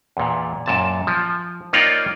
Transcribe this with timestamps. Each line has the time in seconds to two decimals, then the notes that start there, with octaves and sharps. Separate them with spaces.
0.17 E2 A#2
0.66 F#2 A#2 A5
1.07 F3
1.73 A#3 D#4 F4 C#5 D5 G5